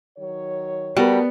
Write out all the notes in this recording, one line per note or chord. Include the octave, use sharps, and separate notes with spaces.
D#3 F#3 C#5
G3 B3 F#4 A4 A#4